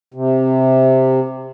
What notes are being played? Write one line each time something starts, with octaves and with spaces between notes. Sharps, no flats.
C3